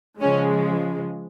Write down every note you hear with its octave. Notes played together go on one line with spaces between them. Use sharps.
C#3 F3 G#3 C#4